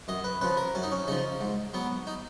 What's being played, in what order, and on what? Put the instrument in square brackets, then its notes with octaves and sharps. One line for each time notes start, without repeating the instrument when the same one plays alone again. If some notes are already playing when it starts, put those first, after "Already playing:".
[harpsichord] F#2 D#5
B4
C#3 F3 B4
A#4
F#2 C#4
D#4
C#4
C#3 F3 D#4
G#2
F#3 B3
D#4